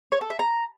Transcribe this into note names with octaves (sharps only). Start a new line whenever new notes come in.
C#5
A4
E5
A#5